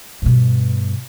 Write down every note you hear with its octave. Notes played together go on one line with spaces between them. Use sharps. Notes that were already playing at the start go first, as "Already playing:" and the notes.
G2 B2